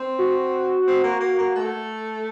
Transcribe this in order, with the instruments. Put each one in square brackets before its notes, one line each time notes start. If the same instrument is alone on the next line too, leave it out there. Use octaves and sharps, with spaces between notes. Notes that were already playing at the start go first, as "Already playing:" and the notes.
Already playing: [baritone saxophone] C4
[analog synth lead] F#4
[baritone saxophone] C4
A#3
A#3
A#3
A3